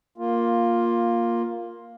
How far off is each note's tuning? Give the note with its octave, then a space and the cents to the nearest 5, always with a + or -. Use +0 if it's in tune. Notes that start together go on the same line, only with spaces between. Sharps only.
A#3 +0 F4 +5